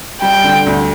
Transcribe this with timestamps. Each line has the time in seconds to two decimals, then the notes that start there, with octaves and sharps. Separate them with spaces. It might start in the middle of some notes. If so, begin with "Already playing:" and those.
0.22 G3 G5
0.44 D3
0.66 D2